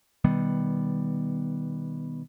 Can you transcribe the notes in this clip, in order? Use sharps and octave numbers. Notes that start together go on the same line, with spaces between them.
B2 D#3 G3 B3